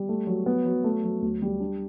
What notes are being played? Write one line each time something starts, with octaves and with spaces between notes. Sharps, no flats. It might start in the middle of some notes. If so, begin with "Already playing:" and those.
Already playing: G3
A3
F#3
B3
F#3
A3
F#3
D2
G3
D4